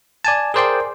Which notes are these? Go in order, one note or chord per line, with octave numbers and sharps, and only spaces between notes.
D5 G#5 A5
G#4 A#4 C5 D5 G5 C6